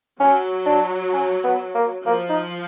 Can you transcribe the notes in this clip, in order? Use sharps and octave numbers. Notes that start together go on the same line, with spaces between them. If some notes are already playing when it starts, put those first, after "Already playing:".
F#3 C#4
D4
C#4
B3
A#3
F3 A#3
D#4